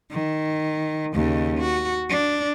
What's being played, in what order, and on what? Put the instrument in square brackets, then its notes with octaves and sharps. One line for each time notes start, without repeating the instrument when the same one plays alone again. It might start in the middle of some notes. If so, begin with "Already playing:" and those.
[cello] D#3
D#2 C#3
F#4
D4